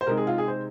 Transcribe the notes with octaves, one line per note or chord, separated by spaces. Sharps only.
C5
C3 G#3 D#4 A#4
G#4
F4
G#4
C5